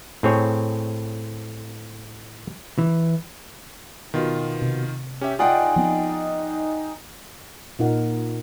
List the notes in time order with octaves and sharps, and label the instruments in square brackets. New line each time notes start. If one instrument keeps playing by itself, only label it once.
[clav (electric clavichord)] A2 C4 G#4 C#5
[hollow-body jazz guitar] E3
[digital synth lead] B2 [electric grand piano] D#3 F4
[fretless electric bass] C3
[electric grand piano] C#4 E5 [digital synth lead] G4
[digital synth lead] D#4 [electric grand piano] F4 D5 F#5 [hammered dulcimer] G#4 G5
[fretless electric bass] F3 B3 C4
[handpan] A#2 D#4 A#4 F#5